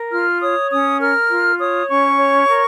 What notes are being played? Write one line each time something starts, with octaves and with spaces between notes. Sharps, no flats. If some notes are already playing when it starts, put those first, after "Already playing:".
Already playing: A#4
F4 F6
C#5 D#6
C#4 D#6
A#4 F6
F4
C#5 D#6
C#4 C#6
C#5
A#4